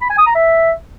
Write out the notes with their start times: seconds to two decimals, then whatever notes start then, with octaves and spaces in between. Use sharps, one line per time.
0.01 B5
0.10 G#5
0.18 D#6
0.26 A#5
0.35 E5